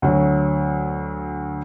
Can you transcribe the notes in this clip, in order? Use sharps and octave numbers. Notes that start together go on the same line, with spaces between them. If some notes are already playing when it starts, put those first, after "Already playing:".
D2 F#3